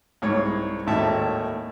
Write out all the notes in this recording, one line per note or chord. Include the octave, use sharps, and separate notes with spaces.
C2 G#2 C#5
G#1 D#2 A2 E5 A5